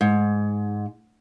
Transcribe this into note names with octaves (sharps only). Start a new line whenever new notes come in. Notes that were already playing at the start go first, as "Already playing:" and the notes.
G#2